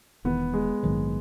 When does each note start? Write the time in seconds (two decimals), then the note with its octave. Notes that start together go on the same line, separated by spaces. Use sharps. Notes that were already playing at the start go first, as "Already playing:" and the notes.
0.24 E1 E2 D#3 B3
0.54 G#3
0.83 A#1 G#2 D#3 F#3